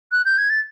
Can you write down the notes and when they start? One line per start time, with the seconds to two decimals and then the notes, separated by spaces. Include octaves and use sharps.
0.12 F#6
0.25 G6
0.38 G#6
0.50 A6